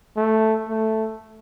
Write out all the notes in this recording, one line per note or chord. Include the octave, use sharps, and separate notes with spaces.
A3
A3